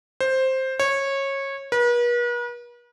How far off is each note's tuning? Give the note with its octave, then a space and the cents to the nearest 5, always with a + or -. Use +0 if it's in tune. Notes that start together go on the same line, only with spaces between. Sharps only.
C5 +5
C#5 -20
B4 -45